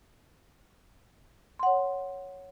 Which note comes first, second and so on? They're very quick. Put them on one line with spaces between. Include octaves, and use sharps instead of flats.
C6 F#5 C#5